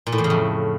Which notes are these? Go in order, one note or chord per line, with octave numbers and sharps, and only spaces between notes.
A#2
A2
E2
C#3
F2